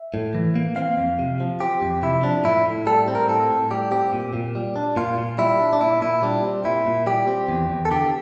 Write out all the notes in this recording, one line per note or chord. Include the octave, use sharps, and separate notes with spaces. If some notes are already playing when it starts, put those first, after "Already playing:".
Already playing: E5
A2
E3
A#3
C4 F5
F2
C3
F3
C4 G4
F2
C3 E4
F3 D4
A2 E4
A2
G3 A4
C4
A#4
A2 A4
A2
G3 G4
C4 G4
A#2
A#2
G3
D4
A#2 F4
A#2
G3 E4
D4
D4
A#2 E4
A#2 E4
G3 D4
C4
A#2 E4
A#2
G3 G4
C4
E2
E2
A4
D3 G4